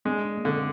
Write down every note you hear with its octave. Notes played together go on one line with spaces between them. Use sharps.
G#3 D4
D4
A#3
D3 C4